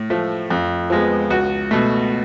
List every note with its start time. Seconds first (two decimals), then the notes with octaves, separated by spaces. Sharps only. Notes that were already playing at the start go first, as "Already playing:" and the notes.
Already playing: A2
0.10 F3 A3
0.50 F2
0.90 F3 G#3 B3
1.30 C#2 F#4
1.71 B2 A3